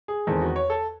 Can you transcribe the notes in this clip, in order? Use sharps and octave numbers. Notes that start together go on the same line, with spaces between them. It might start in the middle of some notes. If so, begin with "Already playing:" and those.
G#4
E2 D#3 G#3 C4 A4
F#4
C#5
A4